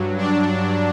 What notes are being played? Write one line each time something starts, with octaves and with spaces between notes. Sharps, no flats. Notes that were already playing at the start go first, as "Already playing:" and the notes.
Already playing: G2 F#3
D4